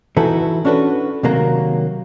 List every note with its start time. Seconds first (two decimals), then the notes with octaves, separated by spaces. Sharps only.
0.17 E3 D#4 E4 F#4 A4 B4
0.65 C#4 D4 F#4 A4 B4
1.23 C3 D#3 F#3 A#3 F#4 A#5